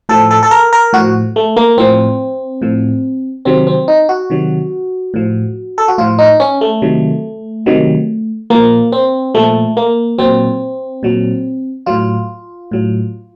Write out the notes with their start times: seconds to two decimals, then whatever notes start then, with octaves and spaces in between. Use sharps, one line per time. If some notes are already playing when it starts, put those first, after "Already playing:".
0.09 A2 F3 A4
0.31 A4
0.43 A4
0.51 A#4
0.73 A#4
0.93 A2 F3 F#4
1.36 A3
1.57 A#3
1.78 A2 F3 C4
2.62 A2 F3
3.45 C3 D#3 F#3 C4
3.67 C4
3.88 D#4
4.09 F#4
4.30 C3 D#3 F#3
5.14 A2 F3
5.78 A4
5.88 F#4
5.98 A2 F3 F4
6.19 D#4
6.40 C#4
6.61 A3
6.82 C3 D#3 F#3
7.66 C3 D#3 F#3
8.50 A#2 F3 A#3
8.92 C4
9.35 A#2 F3 A3
9.77 A#3
10.18 A#2 F#3 C4
11.03 A#2 F#3
11.86 A2 F#3 F4
12.71 A2 F#3